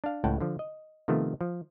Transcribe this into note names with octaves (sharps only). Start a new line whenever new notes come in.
D4 F5
C#2 A2 F#5 G5 A5
D3 F3
D#5
C3 D#3 F3 A3 B3
F3